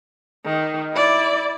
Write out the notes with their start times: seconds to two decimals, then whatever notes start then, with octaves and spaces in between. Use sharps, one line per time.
0.45 D#3
0.93 E4 D5